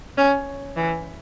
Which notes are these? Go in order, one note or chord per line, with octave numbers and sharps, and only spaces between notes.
C#4
E3